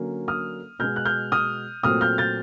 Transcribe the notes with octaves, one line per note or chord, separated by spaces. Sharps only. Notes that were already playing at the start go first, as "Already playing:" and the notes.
Already playing: D3 F#3 A#3 C#4
D#6 F6
B2 G#3 B3 F6 G6
F#6
F6 G6
D#6 F6
A#2 F#3 A3 C4 D#6 F6
F6 G6
G6 A6